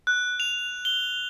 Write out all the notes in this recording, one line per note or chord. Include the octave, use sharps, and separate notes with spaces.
F#6
F7
G7